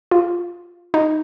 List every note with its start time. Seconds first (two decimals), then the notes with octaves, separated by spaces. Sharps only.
0.11 F4
0.94 D#4